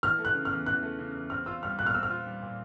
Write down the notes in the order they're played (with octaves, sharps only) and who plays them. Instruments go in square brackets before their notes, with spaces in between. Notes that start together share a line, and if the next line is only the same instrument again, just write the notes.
[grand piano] E3 [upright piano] F6
[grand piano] A3
[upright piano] F#6
[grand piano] C#3
[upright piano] F6
[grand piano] E2
[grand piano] E3 [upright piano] F#6
[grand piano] A3
C#3
E2
[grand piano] C4 [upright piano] F6
[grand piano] F4 [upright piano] E6
[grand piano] G3 [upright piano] F6
[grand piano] A#2 [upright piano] F#6
[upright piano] F6
[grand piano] C4 [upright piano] E6
[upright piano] F6
[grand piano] F4
G3
A#2